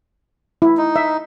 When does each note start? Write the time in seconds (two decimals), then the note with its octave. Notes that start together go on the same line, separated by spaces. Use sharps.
0.62 E4
0.78 D#4
0.96 E5